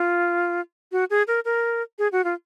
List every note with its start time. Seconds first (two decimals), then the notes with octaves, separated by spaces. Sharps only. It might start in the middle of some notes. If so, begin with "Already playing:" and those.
Already playing: F4
0.92 F#4
1.10 G#4
1.28 A#4
1.45 A#4
1.99 G#4
2.12 F#4
2.25 F4